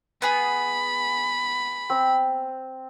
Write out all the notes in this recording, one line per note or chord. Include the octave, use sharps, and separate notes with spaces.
B3 G#4 B5
C4